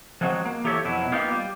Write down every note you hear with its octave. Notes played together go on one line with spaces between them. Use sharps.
F3 F#3 G#3 C4 E4 F#4
A#3
E3 G4 A4 C#5 E5
F2 B2 F#3 E4
A#3 B3 D#4 F4 G4
G3